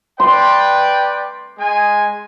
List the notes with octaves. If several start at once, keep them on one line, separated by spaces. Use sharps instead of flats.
B4 D5 G5 C6
G#3 G#5